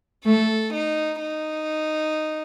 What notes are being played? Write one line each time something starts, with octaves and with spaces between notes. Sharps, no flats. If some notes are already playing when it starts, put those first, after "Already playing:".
A3 A4
D#4
D#4